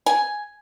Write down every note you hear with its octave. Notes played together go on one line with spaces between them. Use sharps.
G#5